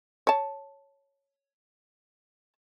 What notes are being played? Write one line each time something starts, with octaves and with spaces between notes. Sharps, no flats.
C#5 A5